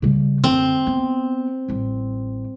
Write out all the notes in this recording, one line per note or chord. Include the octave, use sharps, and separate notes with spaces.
C#3 G3
F#2 D3 C4
B3
A1 G3